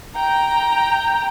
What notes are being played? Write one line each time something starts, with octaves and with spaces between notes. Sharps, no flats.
G5 A#5